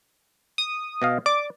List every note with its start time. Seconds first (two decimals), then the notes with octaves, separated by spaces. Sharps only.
0.58 D#6
1.02 B2 D#5 F5
1.26 D5 D6